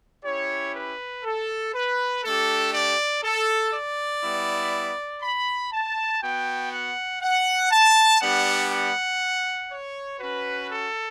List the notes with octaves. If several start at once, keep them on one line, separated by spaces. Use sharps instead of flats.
C#4 E4 G4 C#5
B4
A4
B4
A3 D4 G4 A4
D5
A4
D5
G3 B3 E4
B5
A5
B3 F#4 G5
F#5
F#5
A5
G3 B3 D4 G4 F#5
F#5
C#5
C#4 F#4 B4
A4